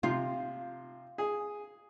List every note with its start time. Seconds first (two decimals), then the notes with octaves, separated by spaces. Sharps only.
0.03 C3 F3 F4
1.18 G#4